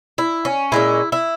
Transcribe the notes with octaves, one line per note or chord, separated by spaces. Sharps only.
E4
C#4
A#2 G#3 C#4 E4
E4